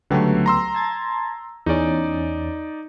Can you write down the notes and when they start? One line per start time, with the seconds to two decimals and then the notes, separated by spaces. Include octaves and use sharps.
0.10 C#2 D3 F#3 A3 B3 G4
0.46 A#5 C6 E6
0.75 A5 G#6 A6
1.66 E2 C#4 D#4 D5